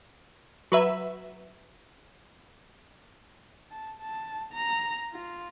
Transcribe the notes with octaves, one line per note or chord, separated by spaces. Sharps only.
F#3 B4 E5
A5
A5
A#5
F4